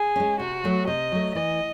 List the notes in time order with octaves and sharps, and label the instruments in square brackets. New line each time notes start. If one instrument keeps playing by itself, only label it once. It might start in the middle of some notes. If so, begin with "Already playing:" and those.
Already playing: [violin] G#4
[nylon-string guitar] G#3 C#4
[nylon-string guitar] C3 [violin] F#4
[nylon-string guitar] F#3 A3
[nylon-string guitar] C3 [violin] D#5
[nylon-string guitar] F#3 A3
[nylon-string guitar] E3 [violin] D#5